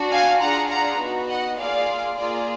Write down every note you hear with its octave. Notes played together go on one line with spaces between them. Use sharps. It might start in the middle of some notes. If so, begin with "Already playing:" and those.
Already playing: D4 F#4
F5 G#5
D4 F4 G#4 F#5 A#5
F#5 A#5
B3 D#4 F#4
D#5 F#5
A#3 F4 G#4 D5 F5
A#3 F4 G#4 D5